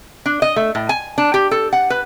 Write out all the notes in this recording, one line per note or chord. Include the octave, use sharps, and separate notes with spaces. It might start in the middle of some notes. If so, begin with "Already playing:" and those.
D4
D#5
A3
A2
G#5
D4
G4
A4
F#5
B4